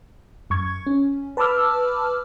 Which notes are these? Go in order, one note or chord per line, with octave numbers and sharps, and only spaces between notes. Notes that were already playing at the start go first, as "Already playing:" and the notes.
F#2 C#6 G#6
C#4
B4 A5 B5 D6 E6 F6